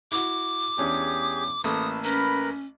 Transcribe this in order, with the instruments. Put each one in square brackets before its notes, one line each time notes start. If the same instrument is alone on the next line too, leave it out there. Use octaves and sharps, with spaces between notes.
[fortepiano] E4 F#4 [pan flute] D6
[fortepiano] E2 C#4 D4 [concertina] G4 G#4
[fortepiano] A1 A3 A#3 [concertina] B4 E6 [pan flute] D#6
[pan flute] C#4 [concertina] A#4 B4 B5